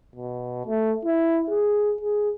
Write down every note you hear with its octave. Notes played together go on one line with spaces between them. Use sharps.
B2
A3
E4
G#4
G#4